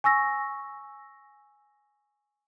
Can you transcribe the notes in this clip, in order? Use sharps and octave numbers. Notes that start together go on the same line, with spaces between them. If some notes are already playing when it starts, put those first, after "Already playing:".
G#5 C#6 E6 A#6